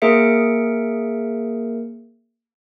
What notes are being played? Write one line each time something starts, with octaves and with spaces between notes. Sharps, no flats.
A#3 G#4 A#4 E5 C#7 D7